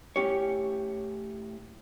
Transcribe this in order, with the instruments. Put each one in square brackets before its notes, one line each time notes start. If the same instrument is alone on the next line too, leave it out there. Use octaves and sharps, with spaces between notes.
[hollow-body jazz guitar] A2 C#4 G4 C#5